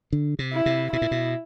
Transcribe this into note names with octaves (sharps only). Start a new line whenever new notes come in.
D3
C3
E4
C3
B2 E4
A#2
B2